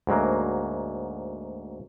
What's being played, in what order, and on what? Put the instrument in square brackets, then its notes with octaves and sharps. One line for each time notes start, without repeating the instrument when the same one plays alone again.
[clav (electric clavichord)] D2 G#2 F#3 A#3